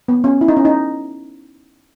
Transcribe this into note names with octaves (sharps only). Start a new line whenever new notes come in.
B3
C#4
E4
D#4
C#4
D#4